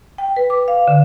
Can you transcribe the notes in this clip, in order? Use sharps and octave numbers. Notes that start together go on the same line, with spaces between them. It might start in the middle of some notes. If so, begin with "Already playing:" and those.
G5
B4
D6
F5
D3